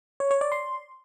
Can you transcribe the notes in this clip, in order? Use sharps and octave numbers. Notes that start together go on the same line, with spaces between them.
C#5
C#5
D5
C6